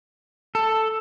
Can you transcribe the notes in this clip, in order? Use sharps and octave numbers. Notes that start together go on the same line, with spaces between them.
A4